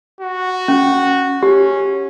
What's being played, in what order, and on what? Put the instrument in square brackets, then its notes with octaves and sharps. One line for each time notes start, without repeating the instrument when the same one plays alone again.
[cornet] F#4
[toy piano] C#4
[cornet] C#4 [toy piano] G4